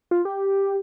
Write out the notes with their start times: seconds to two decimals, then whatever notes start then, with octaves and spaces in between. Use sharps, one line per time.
0.11 F4
0.25 G4